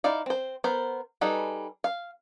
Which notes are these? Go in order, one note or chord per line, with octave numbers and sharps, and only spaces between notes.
D#4 E4 D5 F5
C4 C5
B3 A#4 C5
G3 D#4 G#4 A4 B4
F5